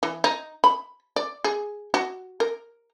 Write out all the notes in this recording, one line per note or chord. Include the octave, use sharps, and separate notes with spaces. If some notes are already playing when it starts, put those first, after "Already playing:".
E3
D#4
B5
D5
G#4
F#4
A#4